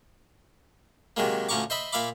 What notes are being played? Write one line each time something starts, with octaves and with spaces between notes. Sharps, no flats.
C3 D#3 F#3 G#3 A#3
D2 F3 C#4 A#5 C#6 D6
C5 D#5 E5 B5
A#2 E5 F5 B5 D6